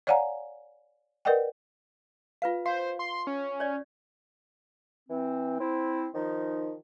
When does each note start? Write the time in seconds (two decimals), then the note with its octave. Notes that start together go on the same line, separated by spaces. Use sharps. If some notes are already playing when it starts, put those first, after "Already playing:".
0.07 C#5 D5 F5 F#5 G#5 A#5
1.25 A#4 B4 D5 D#5 F#5 G5
2.42 F4 B4 F5
2.66 C5 F5
2.99 C6
3.27 C#4
3.60 C#5 D5
5.09 E3 C4
5.59 C4 E4
6.14 D#3 F3 D#4